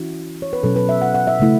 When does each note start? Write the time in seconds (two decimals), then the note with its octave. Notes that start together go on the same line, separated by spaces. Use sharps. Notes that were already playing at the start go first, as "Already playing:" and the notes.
Already playing: E3 C#4 E4 F#4
0.42 C#5
0.53 B4
0.63 B2 F#3 C#4 A4
0.76 B4
0.89 E5
1.02 F#5
1.14 F#5
1.27 E5
1.40 C#3 A3 E4